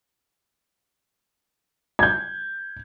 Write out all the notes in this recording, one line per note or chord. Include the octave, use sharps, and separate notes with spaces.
G6 G#6